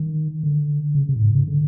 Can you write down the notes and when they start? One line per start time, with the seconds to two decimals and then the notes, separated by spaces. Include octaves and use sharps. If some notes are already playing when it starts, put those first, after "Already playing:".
Already playing: D#3
0.43 D3
0.95 C#3
1.09 C3
1.16 A2
1.22 G#2
1.35 C#3
1.47 D3